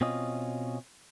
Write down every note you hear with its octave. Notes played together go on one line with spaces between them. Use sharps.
B2 C4 C#4 F4 D#5